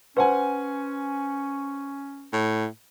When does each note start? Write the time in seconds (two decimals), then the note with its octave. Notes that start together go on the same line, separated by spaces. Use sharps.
0.17 C#4 B4 C5 F#5 G#5
2.33 A2